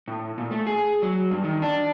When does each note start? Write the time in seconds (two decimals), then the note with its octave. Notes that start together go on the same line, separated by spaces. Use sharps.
0.08 A2
0.38 A#2
0.51 A3
0.67 G#4
1.02 F#3
1.31 G2
1.44 D#3
1.62 D4